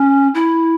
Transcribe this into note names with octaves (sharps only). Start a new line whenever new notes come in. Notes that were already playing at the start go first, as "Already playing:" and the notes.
Already playing: C#4
E4